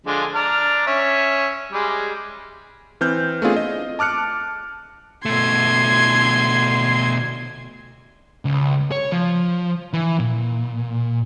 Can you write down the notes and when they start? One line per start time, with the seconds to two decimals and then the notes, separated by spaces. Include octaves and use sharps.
0.07 D3 F3 G#3
0.35 D4 A#5 F6
0.87 C#4 E5
1.72 G3 G#3
3.01 E3 C4 F6 G6
3.42 A3 B3 C4 D4 F4 G#4
3.56 D#5
3.99 A5 D6 F6 F#6 C#7
5.25 B2 A3 C6 G#6
8.45 C#2
8.92 C#5
9.12 F3
9.93 E3
10.20 A#2